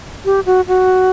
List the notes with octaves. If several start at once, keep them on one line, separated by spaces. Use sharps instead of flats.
G4
F#4
F#4